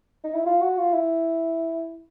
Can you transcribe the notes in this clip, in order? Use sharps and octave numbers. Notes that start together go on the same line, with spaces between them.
D#4
E4
F4
F#4
F4
E4